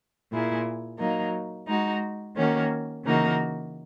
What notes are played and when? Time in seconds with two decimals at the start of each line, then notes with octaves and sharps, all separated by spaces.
0.31 A#2 A#3 E4 G#4
0.99 F#3 A#3 D#4
1.67 G#3 D#4 F#4
2.36 D#3 A#3 C#4 F#4
3.04 C#3 E3 A#3 D#4 F#4